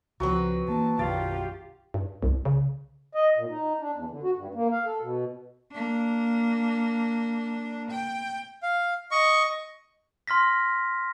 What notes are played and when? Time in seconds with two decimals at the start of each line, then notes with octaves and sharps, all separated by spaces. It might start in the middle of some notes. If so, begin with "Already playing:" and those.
0.20 C#2 F3 F#3 B3 C4 B4
0.68 E3 A#3 A5
0.99 B1 F#2 D#3 F4 G4 D5
1.94 G2
2.23 C2
2.45 C#3
3.15 D#5
3.37 A#2
3.50 D#4
3.80 D4
3.94 E2
4.10 D3
4.23 F#4
4.36 G2
4.55 A#3
4.71 F5
4.86 A4
5.01 B2
5.72 A#3 D4
7.91 G5
8.63 F5
9.11 D#5 C#6
10.27 C6 F6 A#6 B6